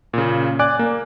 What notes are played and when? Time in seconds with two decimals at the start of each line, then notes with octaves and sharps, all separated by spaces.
0.13 A#2 C#3
0.59 D5 G#5 D6 F#6
0.79 A#3